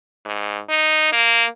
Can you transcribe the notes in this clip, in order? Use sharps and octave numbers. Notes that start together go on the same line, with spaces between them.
G#2
D#4
A#3